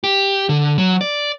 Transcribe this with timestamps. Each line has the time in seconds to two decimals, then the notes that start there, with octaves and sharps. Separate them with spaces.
0.04 G4
0.49 D3
0.78 F#3
1.01 D5